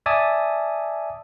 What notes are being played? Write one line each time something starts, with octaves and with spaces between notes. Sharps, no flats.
D5 E5 G#5 A5 D6 D#6